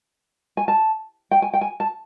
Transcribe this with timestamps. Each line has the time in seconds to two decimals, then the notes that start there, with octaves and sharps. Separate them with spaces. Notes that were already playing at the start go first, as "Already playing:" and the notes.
0.57 G#5
0.68 A5
1.31 G5
1.42 G#5
1.53 G5
1.61 G#5
1.80 A5